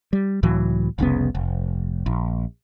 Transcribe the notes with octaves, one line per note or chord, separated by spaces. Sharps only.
G3
C#2 A2 E3 F#3
F1 C2 C#3 B3
F1
A#1